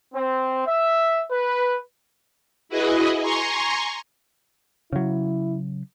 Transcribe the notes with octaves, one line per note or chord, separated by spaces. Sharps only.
C4
E5
B4
E4 F#4 G#4 B4 D#5
G#5 A#5 C6 C#6
C#3 F#3 E4